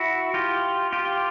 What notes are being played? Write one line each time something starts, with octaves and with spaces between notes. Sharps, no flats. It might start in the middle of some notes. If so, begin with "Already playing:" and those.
Already playing: E4 F#4
F4 G4
F4 G4